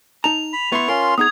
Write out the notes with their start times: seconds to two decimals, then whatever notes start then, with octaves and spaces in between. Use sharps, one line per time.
0.24 D#4 A5 A#5 F7
0.53 B5
0.72 B3 E4 C6 C#6
0.88 C#4 F4 A#4 C6
1.18 B3 D#4 G#4 D#6 G#6